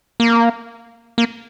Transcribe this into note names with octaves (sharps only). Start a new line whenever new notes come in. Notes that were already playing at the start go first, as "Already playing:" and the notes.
A#3
A#3